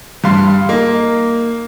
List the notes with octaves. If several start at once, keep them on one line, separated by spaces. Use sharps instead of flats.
G2 G3 F5 C6
A#3 D#4